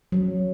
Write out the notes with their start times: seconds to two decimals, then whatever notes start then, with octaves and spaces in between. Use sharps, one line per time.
0.12 F#3